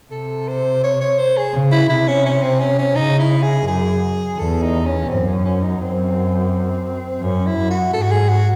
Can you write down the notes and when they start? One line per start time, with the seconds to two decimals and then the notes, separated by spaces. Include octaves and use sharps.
0.11 C3 A4
0.48 C5
0.83 C#5
1.01 C#5
1.18 C5
1.37 G#4
1.53 C#3
1.72 E4
1.89 C3 E4
2.08 C#4
2.26 C#4
2.43 C4
2.60 C#4
2.79 C#4
2.95 C#3 D#4
3.19 E4
3.43 G#4
3.66 F#2 G#4
4.38 E2 A4
4.62 D#4
4.85 C#4
5.08 F#2 C4
5.27 C#4
5.44 C#4
5.62 D#4
5.80 F#2 C4
7.21 F#2 C#4
7.46 E4
7.57 F#2
7.70 F#4
7.93 G#2 A4
8.02 F#4
8.11 G#4
8.29 F#4